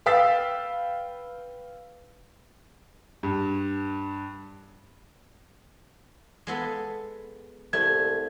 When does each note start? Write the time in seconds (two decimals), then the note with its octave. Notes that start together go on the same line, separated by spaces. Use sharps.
0.06 B4 F5 G5 E6 A6 B6
3.23 G2
6.47 G#3 B3 A4
7.73 C2 A3 G#6